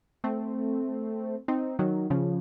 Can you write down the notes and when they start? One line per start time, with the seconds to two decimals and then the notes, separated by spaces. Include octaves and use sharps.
0.24 A3 C4
1.48 C4 D#4
1.79 D#3 F#3
2.10 C#3 F3